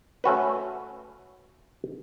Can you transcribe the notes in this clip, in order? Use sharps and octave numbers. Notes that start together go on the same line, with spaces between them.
A3 C#4 F#4 B4